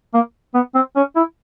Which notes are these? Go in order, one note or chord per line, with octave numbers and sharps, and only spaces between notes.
A#3
B3
C4
C#4
E4